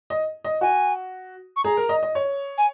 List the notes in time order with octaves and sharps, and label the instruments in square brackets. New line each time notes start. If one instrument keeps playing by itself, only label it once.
[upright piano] D#5
D#5
[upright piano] F#4 [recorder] G#5
[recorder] C#6
[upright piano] G#4 [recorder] A#5
[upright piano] A#4
D#5
D#5
C#5
[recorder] G#5